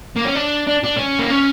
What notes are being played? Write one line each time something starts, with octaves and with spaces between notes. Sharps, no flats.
A#3
C#4
D4
D4
D4
C#4
A#3
C#4